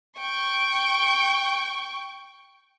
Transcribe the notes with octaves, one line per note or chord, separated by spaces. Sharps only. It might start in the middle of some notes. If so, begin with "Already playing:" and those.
G5 C#6